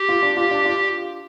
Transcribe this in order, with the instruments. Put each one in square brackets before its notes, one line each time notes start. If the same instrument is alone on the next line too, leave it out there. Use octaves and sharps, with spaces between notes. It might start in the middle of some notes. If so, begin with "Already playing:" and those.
Already playing: [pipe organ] G4
[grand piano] F4
D4
[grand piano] F4 [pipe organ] G4
[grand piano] D4
F4